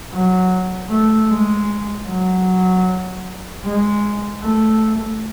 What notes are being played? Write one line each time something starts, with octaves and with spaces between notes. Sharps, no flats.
F#3
A3
G#3
F#3
G#3
A3